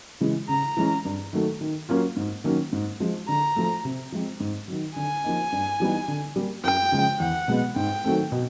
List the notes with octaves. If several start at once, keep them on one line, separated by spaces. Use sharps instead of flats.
C#3 E3 G#3
C#3 A#5
E3 G#3 C#4
G2
D#3 F#3 A3
D#3
F#3 A#3 C#4 F4
G#2
D#3 F#3 A#3 C#4
G#2
F3 G#3
D3 A#5
F3 A3
C3
F3 G#3 C4
G#2
D#3 F#3
D3 G#5
F3 A#3 D#4
G2
E3 G3 B3 D#4
D3
G3 A#3
F#2 G5
C#3 F3 G#3
E2 F#5
B2 G#3 B3
G#2 G5
D#3 F#3 A3 C4
B2